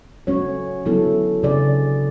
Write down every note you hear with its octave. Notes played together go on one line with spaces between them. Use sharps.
F#3 A3 C#4 F#4 C#5
D3 F#3 B3 E4 A4
C#3 F#3 C#4 G#4 D5